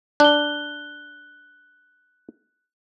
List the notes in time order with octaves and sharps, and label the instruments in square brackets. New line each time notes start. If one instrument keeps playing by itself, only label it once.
[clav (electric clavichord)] D4 [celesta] F#6 G7